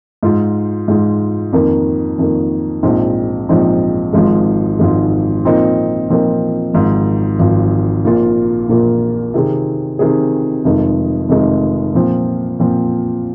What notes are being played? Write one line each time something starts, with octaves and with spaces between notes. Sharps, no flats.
G#2 G#3 F4
G#2 G#3 F4
F2 D#3 A#3
F2 D#3 A#3
A#1 G#2 F3 C4 D#4
A#1 G#2 F3 C4 D#4
G#1 G#2 F3 G#3
G#1 G#2 F3 G#3
A#2 F3 C4 D#4 A#4
A#2 F3 C4 D#4 A#4
G#1 G#2 F3
G#1 G#2 F3
A#1 A#2 A#3 F4
A#1 A#2 A#3 F4
C3 D#3 C4 G#4
C3 D#3 C4 G#4
F1 F2 D#3 G#3 D#4
F1 F2 D#3 G#3 D#4
A#2 F3 C4
A#2 F3 C4